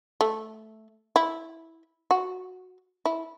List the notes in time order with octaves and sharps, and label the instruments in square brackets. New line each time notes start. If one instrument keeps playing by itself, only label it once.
[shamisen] A3
E4
F#4
E4